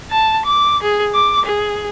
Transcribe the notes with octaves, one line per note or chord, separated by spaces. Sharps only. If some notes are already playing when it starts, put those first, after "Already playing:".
A5
D6
G#4
D6
G#4